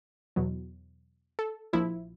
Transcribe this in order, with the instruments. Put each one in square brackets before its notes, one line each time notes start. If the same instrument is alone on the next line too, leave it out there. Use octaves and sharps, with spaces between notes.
[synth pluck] E2 B2 F#3
A4
A#1 A#2 F3 E4